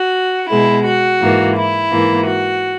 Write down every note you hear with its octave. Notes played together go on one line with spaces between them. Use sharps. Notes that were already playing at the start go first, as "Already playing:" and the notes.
Already playing: F#4
B2 G#3 B3 E4
F#4
G#2 E3 A#3
E4
G#2 E3 A#3
F#4